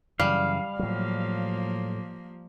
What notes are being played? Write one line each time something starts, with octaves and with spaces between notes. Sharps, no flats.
F#2 C#3 E3 G3 F5
A2 F3 F#3 A#3